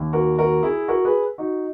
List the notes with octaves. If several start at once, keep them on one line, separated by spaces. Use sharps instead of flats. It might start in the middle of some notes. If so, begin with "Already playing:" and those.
Already playing: D#2 D#3
F#4 A#4
F#4 A#4
E4 G#4
F#4 A#4
G#4 B4
D#4 F#4